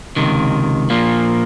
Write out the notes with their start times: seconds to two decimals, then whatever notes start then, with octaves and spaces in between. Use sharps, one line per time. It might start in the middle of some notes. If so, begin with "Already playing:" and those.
0.16 C#2 C3 D#3
0.90 A#2 F3 A#3